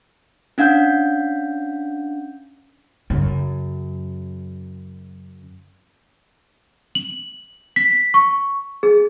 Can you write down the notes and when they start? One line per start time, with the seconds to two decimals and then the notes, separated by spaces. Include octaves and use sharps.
0.58 C#4 D4 F5 F#5 G6
3.10 F#2 C#3
6.95 F#7
7.76 B6
8.14 C#6
8.83 G#4